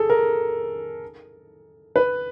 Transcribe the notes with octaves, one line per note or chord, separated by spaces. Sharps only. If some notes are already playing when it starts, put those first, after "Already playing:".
Already playing: G#4 A4
A#4
B4